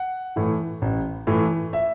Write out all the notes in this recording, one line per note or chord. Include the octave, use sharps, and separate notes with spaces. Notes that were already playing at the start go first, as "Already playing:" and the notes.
Already playing: F#5
A2 E3
A1
A2 E3
E5